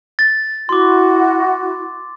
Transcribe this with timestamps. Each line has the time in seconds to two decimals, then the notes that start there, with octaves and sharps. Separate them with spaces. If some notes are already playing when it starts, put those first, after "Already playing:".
0.19 A6
0.69 E4 F#4 C6 D6